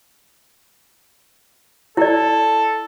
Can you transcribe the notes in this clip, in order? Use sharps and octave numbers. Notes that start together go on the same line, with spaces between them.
E4 A4 D5